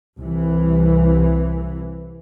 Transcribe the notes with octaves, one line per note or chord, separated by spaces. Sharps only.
C2 E3